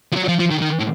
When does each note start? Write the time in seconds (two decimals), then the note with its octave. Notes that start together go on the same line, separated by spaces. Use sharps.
0.13 F3
0.16 F#3
0.28 F3
0.39 F3
0.50 D#3
0.61 D#3
0.79 A2